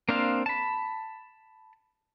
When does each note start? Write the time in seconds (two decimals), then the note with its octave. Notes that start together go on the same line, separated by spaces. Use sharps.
0.09 A#3 C4 D4 C5 F5
0.46 A5 B5